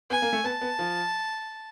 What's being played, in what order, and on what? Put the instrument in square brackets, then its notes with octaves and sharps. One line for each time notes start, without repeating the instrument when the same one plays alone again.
[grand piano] B3 [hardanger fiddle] G#5
[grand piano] A#3
A3
[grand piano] B3 [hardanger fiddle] A5
[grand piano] B3
F3